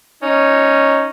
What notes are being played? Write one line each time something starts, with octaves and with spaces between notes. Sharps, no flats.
C#4 D#4